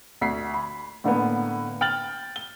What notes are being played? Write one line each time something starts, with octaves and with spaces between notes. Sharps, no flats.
D2 B6 C7
B5
A2 D3 A#3 B3
G5 F6 A6 F#7
G7